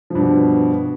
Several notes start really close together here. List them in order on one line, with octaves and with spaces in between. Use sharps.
F3 G2 B2